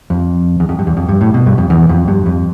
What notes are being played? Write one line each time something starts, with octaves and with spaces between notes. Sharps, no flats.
F2
E2
F2
G2
E2
F2
G2
A2
B2
G2
F2
E2
F2
G2
F2